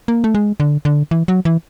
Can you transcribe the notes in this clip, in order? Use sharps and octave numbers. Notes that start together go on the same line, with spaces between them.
A#3
A3
G#3
D3
D3
E3
F#3
E3